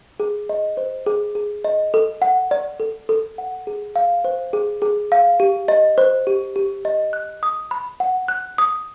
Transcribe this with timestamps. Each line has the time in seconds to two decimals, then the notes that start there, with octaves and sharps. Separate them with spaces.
0.20 G#4
0.49 D#5
0.77 C5
1.06 G#4
1.35 G#4
1.64 D#5
1.94 A4
2.22 F#5
2.51 D5
2.80 A4
3.09 A4
3.38 F#5
3.67 G#4
3.96 F5
4.25 C5
4.53 G#4
4.82 G#4
5.12 F5
5.40 G4
5.68 D#5
5.98 C5
6.27 G4
6.56 G4
6.85 D#5
7.13 F#6
7.43 D#6
7.71 B5
8.00 F#5
8.28 F#6
8.58 D#6